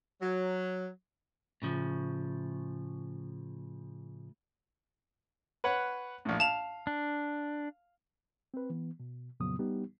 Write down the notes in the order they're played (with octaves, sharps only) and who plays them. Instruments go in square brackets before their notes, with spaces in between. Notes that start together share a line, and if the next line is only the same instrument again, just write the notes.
[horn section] F#3
[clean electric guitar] A2 C#3 F3
[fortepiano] B4 C#5 F#5
A#1 A2
[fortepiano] F5 [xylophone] A5 F7
[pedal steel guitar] D4
[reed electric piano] C4 B4
E3 B3
B2
F2 A#2 C#3 F#3 B3 D#6
G3 B3 D#4 G4